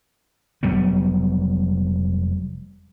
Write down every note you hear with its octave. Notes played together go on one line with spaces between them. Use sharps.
F1 F#3 G3 B3